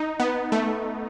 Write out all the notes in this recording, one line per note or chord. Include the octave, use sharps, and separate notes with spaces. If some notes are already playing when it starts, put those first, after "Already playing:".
Already playing: D#4
B3
A3